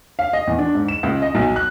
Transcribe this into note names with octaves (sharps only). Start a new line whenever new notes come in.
F5
D#5
E2
D4
G#2
E7
C#2
D#5
B1
F#6